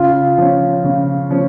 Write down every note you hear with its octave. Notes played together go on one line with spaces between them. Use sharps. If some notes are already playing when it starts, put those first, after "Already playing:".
Already playing: C#3 F4
F3 C#4
C#3
F3 C#4